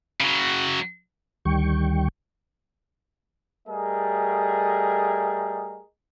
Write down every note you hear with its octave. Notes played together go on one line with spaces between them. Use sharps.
C#3 F#3
D2 D#3 G3 G5 C#6
G3 A3 G#4 A#4 D#5